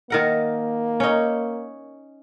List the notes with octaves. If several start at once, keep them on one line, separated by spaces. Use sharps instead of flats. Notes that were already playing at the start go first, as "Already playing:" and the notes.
D#3 A#3 A#4 F#5
C#4 D#4